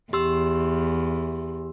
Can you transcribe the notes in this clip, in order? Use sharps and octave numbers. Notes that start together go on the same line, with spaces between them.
E2 G4 C6 E6